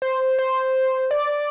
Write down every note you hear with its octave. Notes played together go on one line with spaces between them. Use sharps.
C5
C5
D5